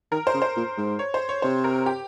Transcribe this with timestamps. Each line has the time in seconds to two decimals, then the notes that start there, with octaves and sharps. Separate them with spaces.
0.12 D#3 A#4
0.27 C5
0.34 C#3
0.42 C5
0.56 A#2
0.77 G#2
0.99 C#5
1.14 C5
1.29 C#5
1.42 C3 C5
1.64 A#4
1.86 G4